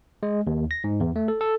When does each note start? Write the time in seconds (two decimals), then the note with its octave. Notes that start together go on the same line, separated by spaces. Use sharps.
0.23 G#3
0.47 D#2
0.71 A#6
0.84 G#2
1.00 E2
1.16 A3
1.28 A4
1.41 A4